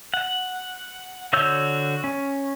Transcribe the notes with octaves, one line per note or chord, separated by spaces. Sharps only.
F#5
D3 F#4 C#5 E6 G6
C#4